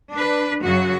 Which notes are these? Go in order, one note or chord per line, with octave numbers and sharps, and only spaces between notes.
D4 B4
F#2 C#3 F#3 F#4